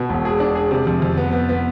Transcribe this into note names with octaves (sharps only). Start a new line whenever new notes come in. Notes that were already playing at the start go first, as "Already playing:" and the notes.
Already playing: B2 B3
E1
G#4
D4
G#4
C3
F2
F2
B3
B3
B3